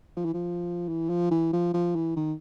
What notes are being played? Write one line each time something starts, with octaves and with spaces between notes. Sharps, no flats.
F3
E3
F3
E3
F3
E3
F3
F3
E3
D#3